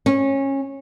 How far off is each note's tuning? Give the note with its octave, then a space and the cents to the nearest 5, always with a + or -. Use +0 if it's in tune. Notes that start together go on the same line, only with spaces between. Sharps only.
C#4 -20